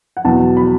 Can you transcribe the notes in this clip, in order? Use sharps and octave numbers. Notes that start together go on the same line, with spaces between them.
F#5
E2 B2 F#3 A5
B5